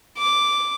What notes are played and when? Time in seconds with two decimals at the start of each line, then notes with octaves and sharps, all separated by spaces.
0.18 D6